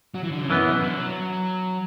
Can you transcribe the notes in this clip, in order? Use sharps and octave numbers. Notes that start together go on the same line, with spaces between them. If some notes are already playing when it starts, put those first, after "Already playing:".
F#3
E3
D3
C#3
F#2 B2 E3 B3
B2
D3
F#3